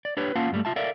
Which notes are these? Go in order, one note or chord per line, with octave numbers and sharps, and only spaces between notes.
D5
D4 G4 B4 C#5
A#3 C#4 F4 F5 F#5 A5
G2 G3 A3
F4 E5 A5
A4 A#4 D5 E5 F5